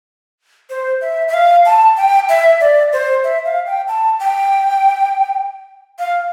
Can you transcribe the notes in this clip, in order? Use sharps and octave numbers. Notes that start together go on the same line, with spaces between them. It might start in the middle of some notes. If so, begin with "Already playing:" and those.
C5
E5
E5
F5
A5
G5
E5
D5
C5
E5
F5
G5
A5
G5
F5